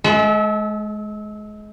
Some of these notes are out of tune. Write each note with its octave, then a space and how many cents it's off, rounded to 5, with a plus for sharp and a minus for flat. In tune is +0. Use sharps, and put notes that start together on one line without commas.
G#3 +30 A4 -25 E5 -35